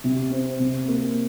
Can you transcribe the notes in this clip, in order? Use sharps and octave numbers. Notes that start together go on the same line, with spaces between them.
C3
C4
C3
A#3